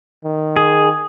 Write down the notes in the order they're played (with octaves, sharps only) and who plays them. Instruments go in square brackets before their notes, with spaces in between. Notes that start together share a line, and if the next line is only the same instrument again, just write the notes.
[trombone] D#3
[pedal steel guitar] G#4 [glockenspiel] D#6